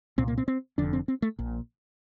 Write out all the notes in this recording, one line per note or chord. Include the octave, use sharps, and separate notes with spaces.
C2 A#2 C4
A#3
C4
C4
F1 F2 D3 D4
C4
C4
A3
A#1 A#2